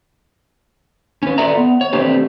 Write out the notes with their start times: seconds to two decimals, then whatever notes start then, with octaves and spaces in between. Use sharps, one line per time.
1.23 C#4 B4
1.38 F4 A4 B4 D5 E5 A#5
1.57 B3
1.81 C#5
1.93 A3 C4 D4 G4 B4